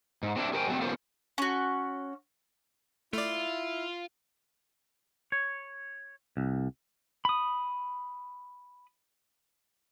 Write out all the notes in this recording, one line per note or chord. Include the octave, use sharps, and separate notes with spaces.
G#2
C4 D4 E4
G#4 A#4 C5 G5 G#5
F#3 A3 C4
B3 C#4 F4 A#4 C5 F5
C#4 F#4
A3 E4 F4 D5
C#5
C2
B5 D#6